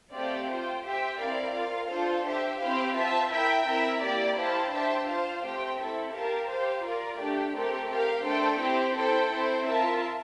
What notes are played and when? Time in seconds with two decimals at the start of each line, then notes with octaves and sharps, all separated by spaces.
0.12 A3 C4 G4 D5 F5
0.47 F4 C5 G5
0.83 G4 C5 E5 G5
1.18 C4 E4 A#4 D5 F5
1.53 F4 A#4 F5
1.88 D4 F4 A4 C5
2.24 G4 C5 E5
2.59 C4 E4 G4 C5 F5
2.95 F4 C5 E5 A5
3.30 E4 A#4 E5 G5
3.65 C4 E4 A#4 E5
4.00 A#3 E4 G4 D5
4.35 E4 G4 C5 F5 A5
4.70 D4 G4 C5 E5 A5
5.06 F4 C5 F5 A5
5.41 A3 C4 G4 C5 G5
5.76 C4 E4 A4 E5
6.12 G4 A#4 F5 A5
6.48 G4 C5 F5
6.82 F4 A#4 D5
7.18 A3 D4 G4
7.53 A3 C4 G4 A#4
7.89 G4 A#4 F5
8.24 A3 D4 A4 C5 G5
8.59 C4 E4 G4 C5
8.95 E4 A4 C5 G5
9.29 C4 E4 A4 C5
9.65 F4 A#4 E5 A5